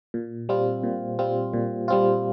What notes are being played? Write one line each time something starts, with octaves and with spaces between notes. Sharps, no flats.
A#2
G3 C4 F4
A#2
G3 C4 F4
A#2
G3 C4 F4